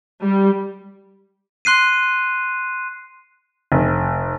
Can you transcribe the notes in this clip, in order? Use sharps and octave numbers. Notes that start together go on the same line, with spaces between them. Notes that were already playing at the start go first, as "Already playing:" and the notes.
G3
C6 F#6 C7 D#7
F1